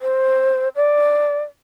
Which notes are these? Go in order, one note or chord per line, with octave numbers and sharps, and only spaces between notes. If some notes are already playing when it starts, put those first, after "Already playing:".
C5
D5